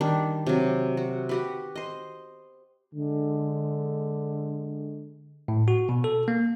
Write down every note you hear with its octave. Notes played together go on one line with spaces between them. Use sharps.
D#3 G3 D4
C3 F#3
F#4
F#4 G4 B4
C5 D#5
D3 G#3
A2
F#4
B2
A4
A#3